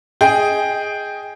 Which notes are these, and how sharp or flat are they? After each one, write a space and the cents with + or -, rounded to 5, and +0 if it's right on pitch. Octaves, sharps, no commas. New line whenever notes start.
G#4 +0 D#5 +10 G5 +0